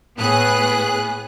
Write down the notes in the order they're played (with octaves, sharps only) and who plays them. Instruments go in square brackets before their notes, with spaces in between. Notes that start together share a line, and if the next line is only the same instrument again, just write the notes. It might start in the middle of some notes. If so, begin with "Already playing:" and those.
[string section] A2 B3 G#4 F#6